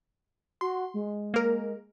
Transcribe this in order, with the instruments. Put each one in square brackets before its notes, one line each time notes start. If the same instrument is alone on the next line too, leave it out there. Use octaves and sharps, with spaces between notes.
[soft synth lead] F#4 [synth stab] C6
[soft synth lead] G#3
[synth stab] A#3 A#4